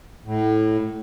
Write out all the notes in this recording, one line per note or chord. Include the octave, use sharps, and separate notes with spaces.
A2